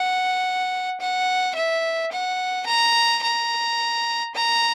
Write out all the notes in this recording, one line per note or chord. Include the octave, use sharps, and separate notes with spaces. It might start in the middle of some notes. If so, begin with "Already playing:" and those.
Already playing: F#5
F#5
E5
F#5
A#5
A#5
A#5